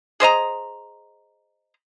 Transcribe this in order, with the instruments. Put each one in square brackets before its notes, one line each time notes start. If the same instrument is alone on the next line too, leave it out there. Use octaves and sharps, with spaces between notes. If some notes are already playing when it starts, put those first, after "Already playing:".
[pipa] G#4 C5 D#5 A#5